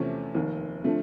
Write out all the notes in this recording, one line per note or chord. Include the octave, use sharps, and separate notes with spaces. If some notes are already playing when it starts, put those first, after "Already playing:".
Already playing: E2 C3 F3 A3 C#4
F1 D#2 D#3
D3 F3 A3